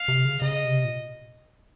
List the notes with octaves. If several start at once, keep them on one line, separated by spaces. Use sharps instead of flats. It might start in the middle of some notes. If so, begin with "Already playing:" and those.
Already playing: F5
C3
C#3
C#3 D#5
C3
A#2